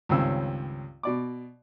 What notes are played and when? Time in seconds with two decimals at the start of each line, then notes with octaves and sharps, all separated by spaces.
0.09 C#2 G2 D#3 C4 C#4 E6
1.03 B2 D5 D6